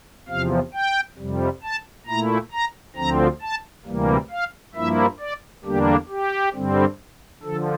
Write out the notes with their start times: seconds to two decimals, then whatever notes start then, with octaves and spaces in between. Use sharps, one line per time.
0.28 E2 C3 F3 F5
0.74 G5
1.17 F2 C3 G3
1.63 A5
2.07 A#2 A3 E4 A#5
2.52 A#5
2.96 D2 D3 F3 C4 A#5
3.41 A5
3.85 D2 C3 E3 G3 A#3
4.31 F5
4.75 G2 F3 A#3 E4 E5
5.20 D5
5.64 E2 D3 G3 A#3 D4 G4
6.09 G4
6.54 G2 D3 G3 C4
7.43 D3 F3 A4